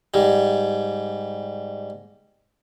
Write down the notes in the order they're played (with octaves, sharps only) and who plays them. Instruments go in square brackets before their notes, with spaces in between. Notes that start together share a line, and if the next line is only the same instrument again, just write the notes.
[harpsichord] G#2 G3